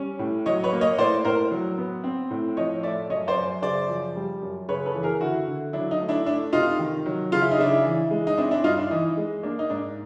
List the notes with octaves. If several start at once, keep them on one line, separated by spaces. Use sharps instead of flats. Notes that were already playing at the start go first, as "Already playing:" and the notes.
Already playing: G3 C#4
A2
F#3 C#5 D#5
B4 C#5
A#3
C#5 D#5
A2 C5 D5
A2 A#4 C5
F#3
B3
C4
A2
F3 C#5 D#5
A3 D5 E5
F#2 C#5 D#5
C5 D5
F#2
C#3 C5 D5
F3
G3
F#2
C#3 B4 C#5
A4 B4
E3
G#4 A#4
D3 E4 F#4
D3
F#3 D4 E4
D#4
A3
D4 E4
A3 D4 E4
C3 D#4 F4
D#3
F#3
C#3 F4
E4
D#4
C#3 D4 E4
E3
G#3
D#4
C4 D4 E4
D4 E4
G2 D#4 F4
D4 E4
E3 D#4
G#3
A#3 D4
D#4
G#2 D4